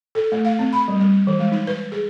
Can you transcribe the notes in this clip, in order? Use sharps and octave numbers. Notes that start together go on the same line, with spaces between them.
A4
A3
F5
C4
B5
G3
G3
E3
G#3
D#4
B4
G#4